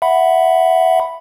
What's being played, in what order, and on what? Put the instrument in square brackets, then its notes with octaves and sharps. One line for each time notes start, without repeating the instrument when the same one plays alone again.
[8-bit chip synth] E5 F#5 B5